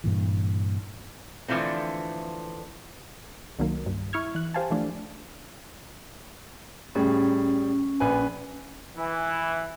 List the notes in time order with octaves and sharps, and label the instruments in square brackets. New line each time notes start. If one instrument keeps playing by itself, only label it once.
[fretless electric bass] G2 A#2 E3
[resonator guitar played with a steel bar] D3 E3 F3 A3 C4
[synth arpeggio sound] C2 D#3 F#3 A#3
G2
E4 C#6 F6 G#6
E3 F#6
G4 C5 F5 G#5 A5
E3 F3 A3 D4
[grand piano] A2 G3 G#4 [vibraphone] C#4
[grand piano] A#1 B4 G#5
[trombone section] E3